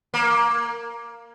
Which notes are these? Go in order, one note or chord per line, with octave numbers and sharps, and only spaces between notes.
A#3